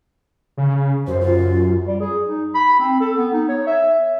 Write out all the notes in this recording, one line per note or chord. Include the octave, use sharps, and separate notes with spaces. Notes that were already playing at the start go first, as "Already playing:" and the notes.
C#3
F#2 C5
F4
G3
G#4
D#4
B5
C4
A4
B3
D#4
C#5
E5